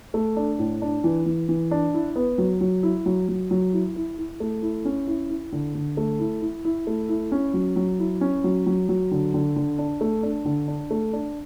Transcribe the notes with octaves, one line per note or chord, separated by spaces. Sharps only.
A3
D4
A2
D4
E3
E3
E3
D4
E4
B3
F#3
F#3
E4
F#3
F#3
F#3
E4
E4
E4
A3
E4
C#4
E4
E4
D3
D3
A3
E4
E4
E4
A3
E4
C#4
F#3
F#3
E4
C#4
F#3
F#3
F#3
D3
D3
D3
D4
A3
D4
D3
D4
A3
D4